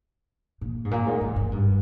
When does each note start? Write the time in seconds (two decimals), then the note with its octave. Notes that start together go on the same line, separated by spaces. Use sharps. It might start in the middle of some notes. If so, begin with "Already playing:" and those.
0.61 A#2
0.85 G#2
0.91 A#2
1.06 G#2
1.21 G#2
1.36 G#2
1.52 G2